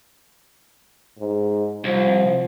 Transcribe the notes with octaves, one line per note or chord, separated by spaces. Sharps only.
G#2
C2 F3